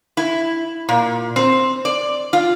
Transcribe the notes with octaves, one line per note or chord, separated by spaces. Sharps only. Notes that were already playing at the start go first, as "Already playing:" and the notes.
E4
A#2
C4
D5
F4